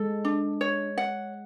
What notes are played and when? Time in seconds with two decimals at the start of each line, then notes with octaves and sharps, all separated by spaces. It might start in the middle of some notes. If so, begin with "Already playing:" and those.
Already playing: G#3 A4
0.25 D4
0.61 C#5
0.98 F#5